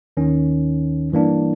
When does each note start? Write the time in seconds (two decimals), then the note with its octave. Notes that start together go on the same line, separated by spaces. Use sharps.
0.17 D#2 D#3 C#4
1.12 G2 E3 A#3 D4